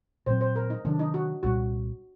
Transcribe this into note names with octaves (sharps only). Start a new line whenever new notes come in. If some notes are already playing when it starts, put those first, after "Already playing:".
A#2 F#3 C4 C5
C5
A#4
D#4
C3 D#3 F#3 D4
D#4
F#4
C2 A#2 G3 F#4